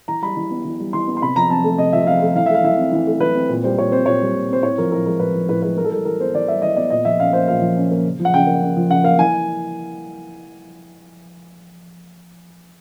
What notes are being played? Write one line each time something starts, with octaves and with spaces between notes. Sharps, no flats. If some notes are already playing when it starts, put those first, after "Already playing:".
E3 A#5
G3 B5
E3
B3
E3
G3
E3 C6
B3
C6
C3 B5
F3 A#5
C4 A5
A3
C3 D#5
F3 E5
C4 F5
A3
E3 F5
E5
A3
F5
E3 E5
C4
E3
A3
E3 B4
C4
A#2
G3 C5
A#2 C#5
C4 C5
A#2 C#5
G3
A#2
C4 C5
A2 C#5
F3 A#4
A2 A#4
G#3 A#4
A2 B4
F3
A2 B4
G#3 B4
E3 A#4
A4
G3 A#4
E3 A#4
B3 C5
E3 D5
G3 E5
E3 D#5
B3 D5
A#2 D#5
F3 E5
C#4 F5
A#3 C5
A#2 F5
F3
C#4
A#3
C#3
F3
F#5
C#3 G5
A#3
C#3
F3
C#3 F#5
A#3 F5
E3 G#5